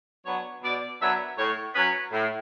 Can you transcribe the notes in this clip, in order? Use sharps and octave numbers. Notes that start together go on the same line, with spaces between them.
F#3 B3 D4 C#5
B2 D5
F#3 B3 D4 E5
A2 C#5
F#3 C#4 B4
A2